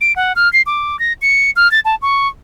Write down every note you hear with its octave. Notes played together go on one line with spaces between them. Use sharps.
D7
F#5
F6
C7
D6
A#6
C#7
F6
A6
A5
C#6